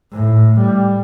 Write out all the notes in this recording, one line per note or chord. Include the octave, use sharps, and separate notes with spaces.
A2
G3